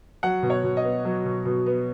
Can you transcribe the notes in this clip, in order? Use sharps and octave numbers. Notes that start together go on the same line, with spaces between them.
F#3 F#5
B2
C#5
B2
D#5
B3
F#3
B2
B2
B3